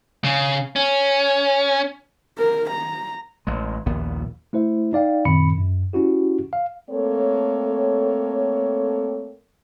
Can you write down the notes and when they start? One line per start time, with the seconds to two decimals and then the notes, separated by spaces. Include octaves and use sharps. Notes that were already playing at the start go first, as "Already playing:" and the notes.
0.24 C#3
0.76 C#4
2.38 A#4
2.71 A#5
3.47 A1 G#3
3.86 A#1 D#2 A#2 B3
4.53 A3 E4 C5 E5
4.93 D#4 D5 F5 G5
5.25 F#2 A#2 D#3 C4 B5 C#7
5.58 F#2
5.93 C#4 E4 F#4 G4
6.53 F5
6.90 A3 A#3 C4 A4 C#5